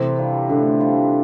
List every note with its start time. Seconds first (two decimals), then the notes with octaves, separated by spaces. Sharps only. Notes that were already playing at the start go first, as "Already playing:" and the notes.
Already playing: C3 E3 A3 C4 C5
0.18 G3 D4 F4
0.49 A2 D3
0.80 G3 D4 F4